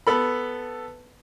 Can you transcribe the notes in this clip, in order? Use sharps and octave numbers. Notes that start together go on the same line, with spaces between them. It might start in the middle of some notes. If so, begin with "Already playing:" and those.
B3 A4 B5